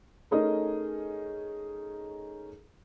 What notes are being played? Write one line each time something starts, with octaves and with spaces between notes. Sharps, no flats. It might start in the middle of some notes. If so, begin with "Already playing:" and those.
A3 C#4 D#4 G#4 A#4 D#5